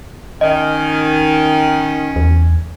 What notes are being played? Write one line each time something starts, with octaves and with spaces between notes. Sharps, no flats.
D#3 C#4 D#5
E2